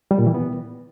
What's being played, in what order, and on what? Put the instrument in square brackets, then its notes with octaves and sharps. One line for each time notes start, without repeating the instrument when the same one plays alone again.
[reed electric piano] G3
A#2
E3
B3